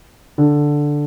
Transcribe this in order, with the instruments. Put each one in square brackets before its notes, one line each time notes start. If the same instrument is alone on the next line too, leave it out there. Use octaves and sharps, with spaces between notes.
[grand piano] D3